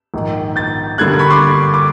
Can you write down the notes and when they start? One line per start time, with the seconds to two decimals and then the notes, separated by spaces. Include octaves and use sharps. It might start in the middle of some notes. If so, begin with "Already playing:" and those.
0.14 A#1 G#2 D#3
0.56 G6 A6
0.98 G2 D3 G3 A#3 F#6 G#6
1.19 B5 C#6
1.30 C6 D6
1.74 D6